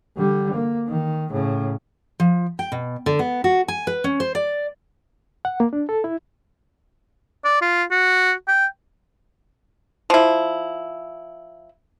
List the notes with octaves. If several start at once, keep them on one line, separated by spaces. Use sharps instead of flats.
D3 G3
A#3
D#3
A2 C#3
F3
G5
B2
D3
B3
F#4
G#5
B4
C#4
C5
D5
F#5
A#3
D4
A4
E4
D5
F4
F#4
G5
F3 E4